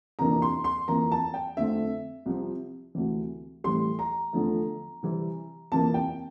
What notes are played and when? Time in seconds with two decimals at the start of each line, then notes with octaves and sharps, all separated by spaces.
0.19 F2 C3 E3 A#3 D4 A#5
0.42 C6
0.64 C6
0.88 F2 E3 A#3 A#5
1.12 A5
1.34 G5
1.57 F2 D3 A3 C4 E5
2.26 C2 C3 F3 C4
2.95 D2 C3 E3
3.64 A2 E3 G3 C6
3.99 A#5
4.33 E2 D3 F3 A3
5.03 C3 E3 G3 C4
5.72 F2 C3 E3 A#3 A5
5.94 G5